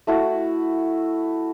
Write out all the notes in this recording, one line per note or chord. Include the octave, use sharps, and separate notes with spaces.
A3 E4 F#4